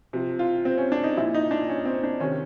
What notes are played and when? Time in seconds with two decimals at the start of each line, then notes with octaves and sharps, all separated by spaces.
0.13 C3 F3
0.39 F4
0.65 C4
0.78 C#4
0.92 D4
1.03 D#4
1.16 A#2 F3 E4
1.34 D#4
1.51 D4
1.69 C#4
1.85 C4
2.03 D4
2.20 C3 D#3 C#4